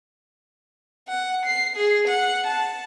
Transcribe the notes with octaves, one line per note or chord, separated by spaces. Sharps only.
F#5
C7
G#4
F#5
A5